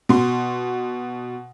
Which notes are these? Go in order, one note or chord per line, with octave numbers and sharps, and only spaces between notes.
B2 C6